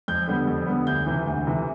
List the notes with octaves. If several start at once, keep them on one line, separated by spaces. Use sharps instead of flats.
F2 G6
D3 G3 B3
F2
D3 G3 B3
D2 G6
C3 E3
D2
C3 E3